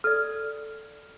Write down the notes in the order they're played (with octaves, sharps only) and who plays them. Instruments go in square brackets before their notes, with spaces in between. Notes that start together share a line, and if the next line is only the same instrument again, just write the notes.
[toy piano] A4 D5 [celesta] F6